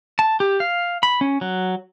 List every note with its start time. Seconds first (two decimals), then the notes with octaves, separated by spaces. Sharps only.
0.19 A5
0.40 G4
0.60 F5
1.03 B5
1.21 C#4
1.41 F#3